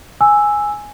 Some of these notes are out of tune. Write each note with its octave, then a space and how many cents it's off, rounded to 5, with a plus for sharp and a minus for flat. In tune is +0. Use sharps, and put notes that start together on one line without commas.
G#5 +0 E6 +0